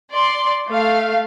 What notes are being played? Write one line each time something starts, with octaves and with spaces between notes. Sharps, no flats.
D5 C6
A3 F5